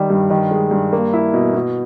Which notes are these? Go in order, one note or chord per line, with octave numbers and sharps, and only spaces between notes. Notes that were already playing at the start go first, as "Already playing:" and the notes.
Already playing: D#3 G3
G2
D#3
G#3
G2
A#3
E4
B2
B2